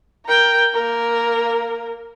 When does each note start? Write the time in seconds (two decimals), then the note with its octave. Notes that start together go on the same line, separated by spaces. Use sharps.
0.26 A#4 G5
0.74 A#3 A#4